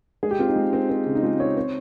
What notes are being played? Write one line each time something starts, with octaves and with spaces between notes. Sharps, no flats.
G#3 G#4
G4
C4 F4
D#4
G#3
C4
C4
C#3
D#4
G#3 F4
C4 C#5
C4